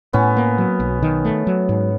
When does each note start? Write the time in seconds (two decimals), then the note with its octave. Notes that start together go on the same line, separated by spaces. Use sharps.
0.13 A2 B3 C#4
0.37 A#3
0.58 F#3
0.80 B1
1.03 D#3
1.25 A3
1.47 F#3
1.69 G#2